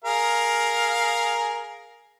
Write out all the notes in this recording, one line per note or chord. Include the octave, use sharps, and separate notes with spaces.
G#4 A#4 F5